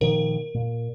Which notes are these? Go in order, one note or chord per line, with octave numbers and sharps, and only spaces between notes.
A#2 D#3 F3 A#4
A#2